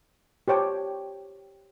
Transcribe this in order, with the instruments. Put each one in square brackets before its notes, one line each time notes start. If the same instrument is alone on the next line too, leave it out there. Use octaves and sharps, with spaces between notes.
[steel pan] G4 C5 C#5 G5 A5